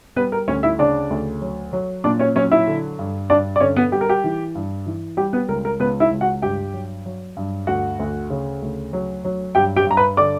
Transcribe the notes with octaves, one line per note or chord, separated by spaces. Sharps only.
G3 B3 B4
A#4
D2 C#4 C#5
E4 E5
C#3 D4 D5
D2
F#3
F#3
A#2 D4 D5
C#4 C#5
F#3 C#4 C#5
E4 E5
D3
G2
G2 D4 D5
D5
D3 C#4 C#5
B3 B4
G3 G4
A#4
G4
E3
G2
E3
G3 G4
B3 B4
C#2 A#4
A#4
C#2 B3 B4
E4 E5
C#2
F#4 F#5
G2 G4 G5
F#3
F#3
G2
D2 F#4 F#5
D2
C#3
D2
F#3
F#3
G2 G4 G5
G4 G5
G2 A#5
B4 B5
D3 D5 D6